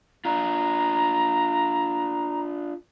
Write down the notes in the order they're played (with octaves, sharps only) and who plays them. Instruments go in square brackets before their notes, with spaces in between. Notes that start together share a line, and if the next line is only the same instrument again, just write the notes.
[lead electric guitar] D4 F4 [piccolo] A#5